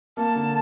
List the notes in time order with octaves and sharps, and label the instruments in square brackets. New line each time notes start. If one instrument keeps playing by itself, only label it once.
[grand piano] A#3 [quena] A5
[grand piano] D3